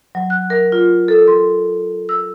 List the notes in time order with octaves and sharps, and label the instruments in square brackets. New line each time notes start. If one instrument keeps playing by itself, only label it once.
[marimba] F#3
F#6
A#4
F4
A4
C6
E6